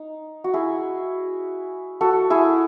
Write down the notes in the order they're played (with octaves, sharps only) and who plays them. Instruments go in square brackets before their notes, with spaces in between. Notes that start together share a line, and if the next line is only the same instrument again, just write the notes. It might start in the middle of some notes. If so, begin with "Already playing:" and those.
Already playing: [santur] D#4
F#4
E4 G#4
F#4 A4
E4 G#4